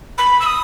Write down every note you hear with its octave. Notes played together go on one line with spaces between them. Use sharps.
B5
E6
D#6